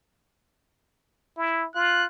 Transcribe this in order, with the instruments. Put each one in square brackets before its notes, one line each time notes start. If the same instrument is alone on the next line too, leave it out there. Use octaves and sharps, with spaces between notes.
[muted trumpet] E4
[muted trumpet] F4 [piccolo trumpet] F#6